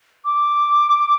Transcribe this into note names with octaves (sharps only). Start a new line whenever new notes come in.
D6